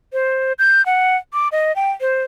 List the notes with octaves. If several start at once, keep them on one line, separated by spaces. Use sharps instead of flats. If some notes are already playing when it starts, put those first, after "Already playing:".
C5
G6
F#5
D6
D#5
G5
C5